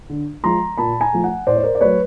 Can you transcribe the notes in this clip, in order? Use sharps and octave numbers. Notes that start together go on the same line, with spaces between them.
D3
F3 G#3 A#5 C6
A#2 A5 B5
G#5 A#5
F3 A3
F#5 G#5
A2 C5 D5
C#5
A#4 C5
D5
F#3 A3 B4 C#5